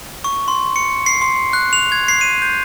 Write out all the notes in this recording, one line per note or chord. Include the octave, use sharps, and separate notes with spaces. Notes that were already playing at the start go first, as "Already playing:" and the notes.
C#6
C6
C#7
C7
C6
F#6
F7
G#6
C7
D#7
G6